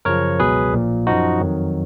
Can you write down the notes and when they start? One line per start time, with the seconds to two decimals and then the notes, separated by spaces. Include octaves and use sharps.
0.05 F#2 C#3 F3 A#4 C#5
0.39 C#2 B2 F#3 G#4 B4
0.73 A#1 A#2 F3
1.07 F#2 F3 D#4 F#4
1.40 F2 D#3 F#3